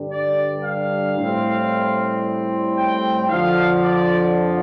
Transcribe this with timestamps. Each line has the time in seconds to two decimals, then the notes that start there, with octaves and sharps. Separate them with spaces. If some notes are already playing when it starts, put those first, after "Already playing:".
Already playing: G2 D3 G3 D4
0.11 D5
0.64 F5
1.17 A2 G3 C4
2.77 G5
3.29 F2 D3 F3 F5
3.82 D5